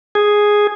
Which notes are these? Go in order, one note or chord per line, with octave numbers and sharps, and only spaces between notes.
G#4